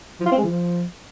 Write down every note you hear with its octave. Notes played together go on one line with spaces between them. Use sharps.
F3
F4
C4
G#3
F3